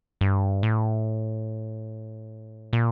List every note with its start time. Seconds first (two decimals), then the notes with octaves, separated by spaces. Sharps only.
0.21 G2
0.63 A2
2.73 A#2